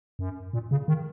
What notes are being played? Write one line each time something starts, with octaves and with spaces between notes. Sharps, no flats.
F#2
A#2
C#3
D#3